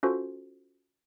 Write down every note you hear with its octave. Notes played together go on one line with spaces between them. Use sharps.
C#4 F4 F#4 A4 C5 C#6